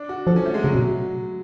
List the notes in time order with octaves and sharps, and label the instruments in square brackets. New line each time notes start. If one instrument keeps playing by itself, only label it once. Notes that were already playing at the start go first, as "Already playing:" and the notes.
Already playing: [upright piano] D4
F#4
[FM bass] F3 [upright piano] A4
[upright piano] C#4
A3
G#3
[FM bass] C#3 [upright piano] F#3
[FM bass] B2